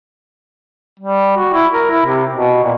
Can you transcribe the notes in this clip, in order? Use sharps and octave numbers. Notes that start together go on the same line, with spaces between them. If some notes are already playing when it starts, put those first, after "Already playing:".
G3
F#4
E4
A#4
E4
C3
B2
A#2